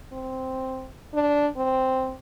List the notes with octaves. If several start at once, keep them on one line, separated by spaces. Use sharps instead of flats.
C4
D4
C4